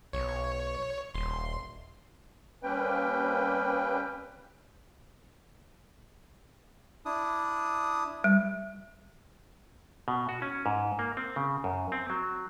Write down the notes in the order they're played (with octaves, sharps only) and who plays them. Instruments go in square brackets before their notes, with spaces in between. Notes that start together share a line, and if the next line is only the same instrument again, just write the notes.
[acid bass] B1 [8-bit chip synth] C#5
[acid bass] D#1 [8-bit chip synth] C6
[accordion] G3 A#3 C4 C#4 B4 G5
[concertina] D4 E4 D#6
[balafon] G3
[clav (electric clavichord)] B2
F#4
C#4
G#2
A#3
C4
C#3
F#2
C4
F#3